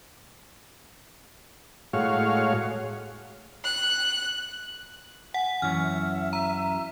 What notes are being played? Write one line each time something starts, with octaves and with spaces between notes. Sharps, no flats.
A2 G#3 F#4 C#5 F5
F#6
F#5 G#5
F#2 E3 C#5 F6
E5
A#5